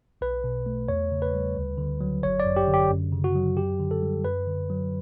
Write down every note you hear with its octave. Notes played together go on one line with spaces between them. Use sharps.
B1 B4
B2
A3
E2 C#5
C#3
B4
G3
D2
D3
F#3
G1 C#5
D5
F#2
G4
D3
G4
F#2
C#3
F#4
F#3
F#2 G4
D3
A4
G3
F#2 B4
D3
F#3